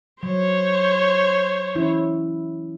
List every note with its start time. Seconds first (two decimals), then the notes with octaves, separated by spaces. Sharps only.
0.23 F#3 C5 C#5
1.75 E3 C#4 E4